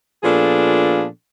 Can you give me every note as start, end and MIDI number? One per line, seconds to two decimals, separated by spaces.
0.23 1.05 46
0.23 1.05 53
0.23 1.05 59
0.23 1.05 62
0.23 1.05 68
0.23 1.05 69